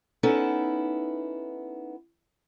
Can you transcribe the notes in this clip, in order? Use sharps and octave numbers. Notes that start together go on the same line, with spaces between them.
B3 C#4 D#4 E4 A4